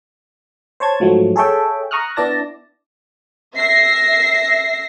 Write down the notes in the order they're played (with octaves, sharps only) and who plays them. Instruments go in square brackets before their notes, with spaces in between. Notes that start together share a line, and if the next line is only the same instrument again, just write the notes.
[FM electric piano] C5 C#5 A5 G#6
G#2 F3 F#3 A3
G#4 A4 C#5 E5 G5
A#5 C#6 D#6 F6 F#6
B3 D4 E4 D5 A5 A#6
[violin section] E5 A#6 C7